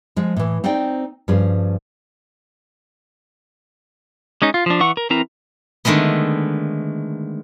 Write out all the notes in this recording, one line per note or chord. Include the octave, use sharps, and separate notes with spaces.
F3 G#3
A2 E3
C4 D#4 C5 D5 G5
G2 F3 C#4 G#4 C5
G#3 C#4 D#4
F4
F3 D4
E3 F#5 C#6
A#4
E3 C4 E4 A#4 A#5
D3 D#3 G#3 A3 B3